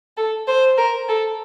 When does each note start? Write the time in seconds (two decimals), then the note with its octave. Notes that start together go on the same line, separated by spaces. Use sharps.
0.17 A4
0.48 C5
0.77 A#4
1.09 A4